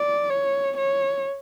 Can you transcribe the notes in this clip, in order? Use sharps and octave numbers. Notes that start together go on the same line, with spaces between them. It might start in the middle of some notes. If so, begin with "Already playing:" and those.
Already playing: D5
C#5
C#5